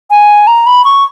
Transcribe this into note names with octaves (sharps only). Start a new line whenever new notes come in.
G#5
A#5
B5
C#6